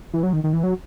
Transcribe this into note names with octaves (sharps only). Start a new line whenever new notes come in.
E3
F#3
D#3
D#3
E3
F#3